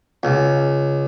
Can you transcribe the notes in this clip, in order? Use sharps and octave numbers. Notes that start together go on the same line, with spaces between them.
C#2